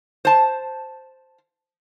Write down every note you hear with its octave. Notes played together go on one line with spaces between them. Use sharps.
C5 A5